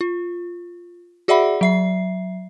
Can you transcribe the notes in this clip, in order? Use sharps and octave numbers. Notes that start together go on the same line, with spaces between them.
F4
F#4 G#4 D5 E5 F#5 B5
F#3 E5 C7